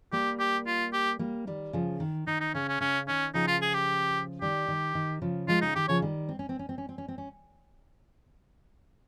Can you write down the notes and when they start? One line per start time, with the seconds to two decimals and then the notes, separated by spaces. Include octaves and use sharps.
0.12 G3 A#3 G4
0.39 G4
0.67 F4
0.93 G4
1.19 G3 A#3
1.47 D#3 G3
1.73 C#3 F3
2.00 D#3
2.27 D#3 D#4
2.40 D#4
2.55 C#3 C#4
2.68 C#4
2.80 C#3 C#4
3.08 D#3 C#4
3.34 C#3 F3 D#4
3.47 F4
3.61 G#4
3.74 G4
4.41 D#3 G3 G4
4.68 D#3
4.95 D#3
5.22 C#3 F3
5.48 F3 G#3 F4
5.61 C#3 D#4
5.75 D#3 G4
5.88 C#3 F3 C#5
6.02 D#3 G3
6.29 C4
6.39 C#4
6.49 C4
6.59 C#4
6.69 C4
6.78 C#4
6.89 C4
6.98 C#4
7.08 C4
7.18 C#4